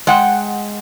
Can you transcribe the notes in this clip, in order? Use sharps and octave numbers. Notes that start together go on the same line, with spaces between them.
G#3 F#5 G5